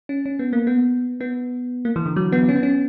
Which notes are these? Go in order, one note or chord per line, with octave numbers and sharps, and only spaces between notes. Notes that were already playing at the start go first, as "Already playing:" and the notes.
C#4
C#4
B3
A#3
B3
B3
A#3
E3
D3
F#3
B3
C#4
B3
C#4